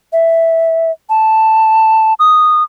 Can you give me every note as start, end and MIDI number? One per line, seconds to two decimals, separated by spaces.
0.13 0.91 76
1.10 2.14 81
2.20 2.63 87